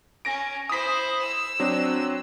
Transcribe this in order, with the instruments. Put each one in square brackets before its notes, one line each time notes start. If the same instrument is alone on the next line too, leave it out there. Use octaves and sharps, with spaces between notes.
[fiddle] C#4 [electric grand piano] A#6 D7
[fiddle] E4 C5 [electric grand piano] D#6 B6
[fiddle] E6
[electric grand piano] F#3 C4 D4